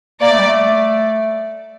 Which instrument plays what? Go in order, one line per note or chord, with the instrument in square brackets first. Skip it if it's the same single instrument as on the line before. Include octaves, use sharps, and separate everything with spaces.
[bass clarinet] A#3 [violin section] D5
[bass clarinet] A3
G3
A3